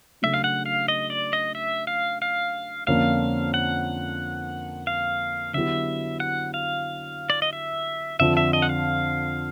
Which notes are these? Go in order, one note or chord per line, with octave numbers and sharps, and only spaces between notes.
C#3 F#3 A3 D4 E5
F5
F#5
F5
D#5
D5
D#5
E5
F5
F5
F2 D3 F3 A#3 C#4 F5
F#5
F5
D3 F#3 B3 E4 G4 E5
F#5
F5
D5
D#5
E5
F2 D3 F3 E5
E5
D#5
F#5
F5